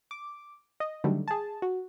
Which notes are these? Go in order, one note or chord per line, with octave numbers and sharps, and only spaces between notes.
D6
D#5
D3 D#3 F#3 G3 A3
G#4 A5
F#4